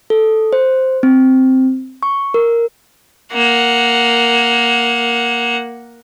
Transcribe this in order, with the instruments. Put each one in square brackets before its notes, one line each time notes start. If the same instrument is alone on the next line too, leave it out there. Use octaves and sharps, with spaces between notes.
[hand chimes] A4
C5
C4
C#6
A#4
[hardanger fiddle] A#3 F#5